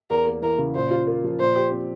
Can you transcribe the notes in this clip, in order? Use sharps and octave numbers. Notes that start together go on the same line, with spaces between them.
E2 A#4
A#3
E3 A#4
C#3
A#2 C5
F4
A#3
F3
A#2 C5
G4
C4